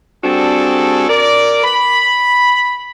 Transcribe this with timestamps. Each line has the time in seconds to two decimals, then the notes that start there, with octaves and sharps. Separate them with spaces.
0.24 G3 C4 D4 F#4 G#4 A4
1.09 A#4 D5
1.64 B5